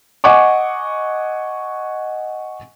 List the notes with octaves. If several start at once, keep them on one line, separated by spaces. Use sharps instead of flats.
D#5 F#5 G#5 C#6 D6